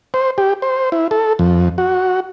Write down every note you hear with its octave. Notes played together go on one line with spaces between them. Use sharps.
C5
G4
C5
E4
A4
F2
F#4